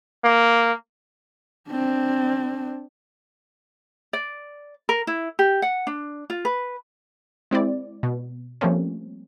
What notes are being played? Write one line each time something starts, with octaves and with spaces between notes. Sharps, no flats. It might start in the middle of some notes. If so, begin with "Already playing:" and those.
A#3
C4 D4
D5
A#4
E4
G4
F#5
D4
F4
B4
G#3 C4 E4 D5
B2
F3 G3 A3 A#3 C4 C#4